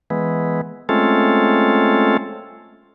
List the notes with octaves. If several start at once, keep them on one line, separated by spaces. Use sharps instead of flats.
E3 G#3 B3
G#3 A3 C4 C#4 F4 A4